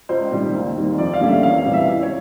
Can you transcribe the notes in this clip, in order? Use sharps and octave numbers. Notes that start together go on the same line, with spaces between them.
C#2 C5
C3 D#3 G3
D#2
D#3 G3 C4
F2 D5
F5
D3 G3 A#3 C#4
E5
E2 F5
F5
C3 E3 G3
E5
C#2
C#5